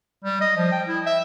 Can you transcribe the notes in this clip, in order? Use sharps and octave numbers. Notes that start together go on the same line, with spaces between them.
G3
D#5
F3
G5
E4
E5